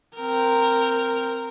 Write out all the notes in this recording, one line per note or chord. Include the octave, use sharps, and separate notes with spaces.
C4 A#4